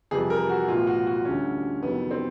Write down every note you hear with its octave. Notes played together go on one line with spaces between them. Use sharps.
F2 C3 E3 G3 G#4
A#4
F#4
B1 A2 E3 F4
F#4
F#4
D2 D3 G3 C#4
F2 C3 D#3 F#3 B3
C4